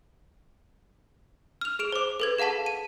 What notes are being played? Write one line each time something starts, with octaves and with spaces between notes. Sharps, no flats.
F6 F7
G#4 D7 F7
C5 D6
A4 B4 G#6
G#4 F5 F#5 A5 B6
D#7